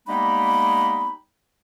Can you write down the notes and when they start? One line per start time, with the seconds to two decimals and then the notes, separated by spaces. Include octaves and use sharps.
0.07 G3 G#3 A#3 B3 D#4 B5